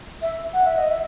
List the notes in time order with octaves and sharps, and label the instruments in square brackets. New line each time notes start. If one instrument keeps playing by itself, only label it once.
[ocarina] E5
F#5
E5
D#5
E5